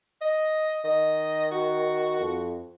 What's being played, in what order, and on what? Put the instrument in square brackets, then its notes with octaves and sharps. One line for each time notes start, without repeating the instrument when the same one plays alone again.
[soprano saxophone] D#5
[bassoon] D#3 [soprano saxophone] D#5
[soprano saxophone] F#4
[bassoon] F2